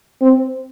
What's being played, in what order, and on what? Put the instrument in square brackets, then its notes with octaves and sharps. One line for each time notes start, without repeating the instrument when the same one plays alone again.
[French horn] C4